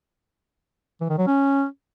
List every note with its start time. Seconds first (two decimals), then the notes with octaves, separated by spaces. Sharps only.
1.01 E3
1.09 D#3
1.18 F#3
1.27 C#4